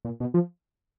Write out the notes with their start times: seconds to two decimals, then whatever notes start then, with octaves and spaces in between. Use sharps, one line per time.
0.05 A#2
0.20 B2
0.34 F3